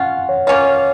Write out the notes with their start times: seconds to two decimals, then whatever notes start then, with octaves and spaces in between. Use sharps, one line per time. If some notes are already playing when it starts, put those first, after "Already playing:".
Already playing: C#4 F4 F#5
0.29 C#5
0.47 A#3 C#4 F4 C#5